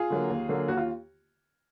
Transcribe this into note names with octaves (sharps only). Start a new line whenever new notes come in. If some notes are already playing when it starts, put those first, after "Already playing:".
Already playing: F4 G#4
D3 F#3 A#3
D#2
D3 F#3 A#3
D#2 F#4
F4